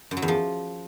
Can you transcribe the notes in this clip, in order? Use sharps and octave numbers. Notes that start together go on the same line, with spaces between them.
F#2
F#3
E2
F3